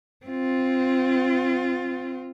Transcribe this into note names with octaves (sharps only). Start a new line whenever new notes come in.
C4 F4